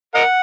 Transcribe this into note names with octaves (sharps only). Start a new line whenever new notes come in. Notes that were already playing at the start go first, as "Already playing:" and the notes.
A#4 D#5 F#5